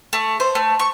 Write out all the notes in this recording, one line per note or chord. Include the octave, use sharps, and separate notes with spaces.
A3
C5
A3
C#6